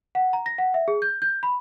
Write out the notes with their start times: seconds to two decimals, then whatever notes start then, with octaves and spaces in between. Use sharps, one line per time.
0.15 F#5
0.33 A#5
0.46 A#6
0.58 F#5
0.74 E5
0.88 G#4
1.02 G6
1.22 G6
1.43 B5